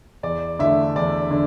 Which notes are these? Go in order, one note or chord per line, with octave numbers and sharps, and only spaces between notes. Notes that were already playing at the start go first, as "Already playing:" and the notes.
E2 D5
D3 A3 D4 E5
E2 D5
D3